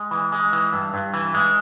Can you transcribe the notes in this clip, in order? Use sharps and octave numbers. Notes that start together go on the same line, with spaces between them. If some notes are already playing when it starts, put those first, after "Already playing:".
Already playing: G#3
E3
G#3
E3
G2
G2
E3
G#3